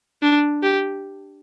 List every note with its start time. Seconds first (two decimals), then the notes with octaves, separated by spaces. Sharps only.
0.22 D4
0.63 G4